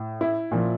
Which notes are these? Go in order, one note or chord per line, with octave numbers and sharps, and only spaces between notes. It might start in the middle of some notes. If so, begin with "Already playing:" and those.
Already playing: A2
E4
A#2 F3